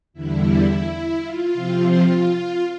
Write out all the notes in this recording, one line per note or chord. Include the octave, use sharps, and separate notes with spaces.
E2 D3 G3 E4
F4
C3 F3 C4
F4